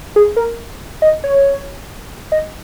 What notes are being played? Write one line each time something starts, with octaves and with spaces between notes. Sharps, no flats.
G#4
A#4
D#5
C#5
D#5